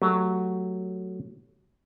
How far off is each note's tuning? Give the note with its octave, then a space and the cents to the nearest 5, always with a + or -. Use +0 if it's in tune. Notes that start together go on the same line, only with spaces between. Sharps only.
F#3 +0 A3 +5 G4 -10